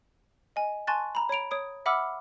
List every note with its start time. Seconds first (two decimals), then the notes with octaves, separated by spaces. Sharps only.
0.56 D#5 G#5
0.87 G#5 A5 C6 C#6 F#6 A6
1.15 A#5 B5
1.29 C#5 B5 D7 F7
1.51 C#5 D#6 D7
1.86 E5 F#5 B5 D6 E6 F6